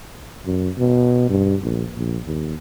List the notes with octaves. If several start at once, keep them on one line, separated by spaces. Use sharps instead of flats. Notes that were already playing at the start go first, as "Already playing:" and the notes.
F#2
B2
G2
A#1
A#1
D#2